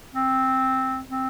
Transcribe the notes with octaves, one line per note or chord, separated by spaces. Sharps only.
C4
C4